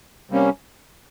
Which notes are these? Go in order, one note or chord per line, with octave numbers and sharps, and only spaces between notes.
C3 G3 A#3 C#4